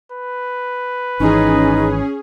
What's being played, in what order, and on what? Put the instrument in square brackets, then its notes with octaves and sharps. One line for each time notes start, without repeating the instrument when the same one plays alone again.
[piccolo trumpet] B4
[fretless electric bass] G#1 E3 [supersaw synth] C#4 G#4 [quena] D#4